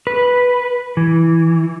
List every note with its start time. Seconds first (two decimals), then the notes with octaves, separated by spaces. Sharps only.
0.07 B4
0.97 E3